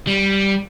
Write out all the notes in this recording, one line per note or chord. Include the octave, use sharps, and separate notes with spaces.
G3